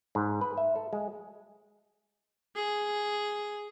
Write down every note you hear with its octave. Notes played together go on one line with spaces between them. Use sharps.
G#2
B4
E5
A4
G#3
G#4